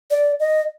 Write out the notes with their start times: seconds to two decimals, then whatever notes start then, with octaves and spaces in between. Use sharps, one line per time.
0.11 D5
0.40 D#5